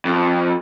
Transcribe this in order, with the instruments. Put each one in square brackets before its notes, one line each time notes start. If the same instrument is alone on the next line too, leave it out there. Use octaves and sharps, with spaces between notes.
[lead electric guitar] F2